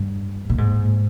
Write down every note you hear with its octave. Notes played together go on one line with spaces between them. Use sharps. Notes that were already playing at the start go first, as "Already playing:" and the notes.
Already playing: G2
A#2
G#2